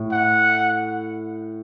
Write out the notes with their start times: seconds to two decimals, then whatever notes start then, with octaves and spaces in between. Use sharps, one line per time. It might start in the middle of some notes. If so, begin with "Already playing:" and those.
Already playing: A2
0.12 F#5